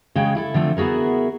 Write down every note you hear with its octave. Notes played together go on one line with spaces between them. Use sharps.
C#3 G#3 F#4 G#4 G5
E4 G4 A4
D3 F3 A3 C4
B3 E4 F#4 G#4 A#4